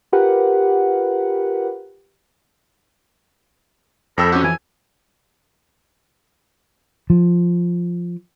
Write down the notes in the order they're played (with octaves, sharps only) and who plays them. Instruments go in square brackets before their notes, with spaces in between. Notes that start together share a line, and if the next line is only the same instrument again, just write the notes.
[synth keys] F4 G4 A#4 B4 F#5
[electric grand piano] F2 E6 [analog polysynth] A4 G5 B5 [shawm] A#4
[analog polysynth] C#4 F#4 [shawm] G4
[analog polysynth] E3 [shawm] G#5
[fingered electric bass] F3